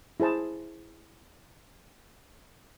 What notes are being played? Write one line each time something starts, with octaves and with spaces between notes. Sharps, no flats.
E4 G#4 C5 A5